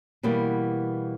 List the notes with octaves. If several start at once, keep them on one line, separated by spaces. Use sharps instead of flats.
B2 E3 G3 A#3 B3